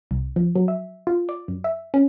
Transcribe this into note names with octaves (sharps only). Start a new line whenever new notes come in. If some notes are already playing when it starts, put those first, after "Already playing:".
C2
F3
F#3
E5
F4
D5
F#2
E5
C#4